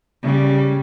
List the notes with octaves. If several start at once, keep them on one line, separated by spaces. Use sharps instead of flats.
C#3 G3